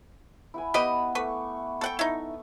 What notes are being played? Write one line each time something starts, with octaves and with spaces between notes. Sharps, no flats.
E4 F#5 G#5
B3 G4 B4 D#5 F#5 B5
A3 B4 C#6 D6
A4 E5 F#5 G5 A5 C#6
D#4 E4